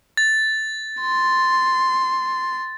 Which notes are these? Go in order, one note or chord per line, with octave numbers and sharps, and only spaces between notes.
A6
C6